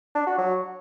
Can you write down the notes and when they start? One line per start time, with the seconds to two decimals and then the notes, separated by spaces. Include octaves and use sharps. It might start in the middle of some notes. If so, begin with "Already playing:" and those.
0.15 D4
0.27 F#4
0.38 F#3